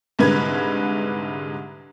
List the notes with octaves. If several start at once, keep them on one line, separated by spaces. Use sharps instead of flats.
C2 G#2 D3 B4 G#6